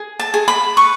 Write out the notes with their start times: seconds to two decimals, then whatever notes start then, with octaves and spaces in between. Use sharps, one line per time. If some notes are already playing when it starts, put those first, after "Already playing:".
Already playing: G#4
0.20 A5
0.34 G#4
0.48 B5
0.77 B4 C#6